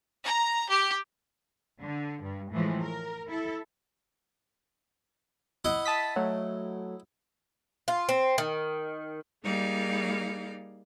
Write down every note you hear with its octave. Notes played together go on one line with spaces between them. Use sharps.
A#5
G4
D3
G2
A2 E3 F3 G#3
A#4
E4 A4
E4 D#5 F#5
A5 D#6 B6
F#3 A3
F4
C4
D#3
G3 A#3 D#4 G#4 D5 F5